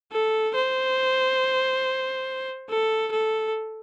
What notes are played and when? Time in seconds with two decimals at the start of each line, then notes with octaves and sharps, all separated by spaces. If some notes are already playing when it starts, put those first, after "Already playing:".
0.12 A4
0.55 C5
2.70 A4
3.12 A4